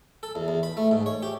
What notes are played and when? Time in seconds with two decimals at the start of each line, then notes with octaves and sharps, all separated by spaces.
0.23 A4
0.35 E2
0.48 E2
0.63 B5
0.77 A3
0.91 G#2
1.06 C#5
1.23 G4